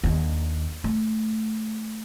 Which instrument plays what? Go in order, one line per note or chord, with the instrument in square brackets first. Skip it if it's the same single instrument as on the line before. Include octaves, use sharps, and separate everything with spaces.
[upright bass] D#2 D4
A3